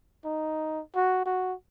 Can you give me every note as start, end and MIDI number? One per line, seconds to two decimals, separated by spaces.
0.24 0.81 63
0.95 1.22 66
1.25 1.54 66